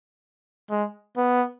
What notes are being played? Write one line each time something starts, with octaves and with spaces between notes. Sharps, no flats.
G#3
B3